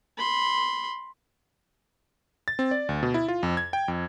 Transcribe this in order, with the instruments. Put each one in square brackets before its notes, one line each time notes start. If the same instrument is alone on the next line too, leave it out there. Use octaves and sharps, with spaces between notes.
[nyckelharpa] B5 C6
[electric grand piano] A6
C4
D5
D2
B2
E4
F4
F2
G#6
G5
F2